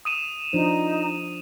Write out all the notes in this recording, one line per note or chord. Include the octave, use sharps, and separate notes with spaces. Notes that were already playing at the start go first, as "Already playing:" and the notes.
D#6 D#7 E7
F3 D4 D#4 C5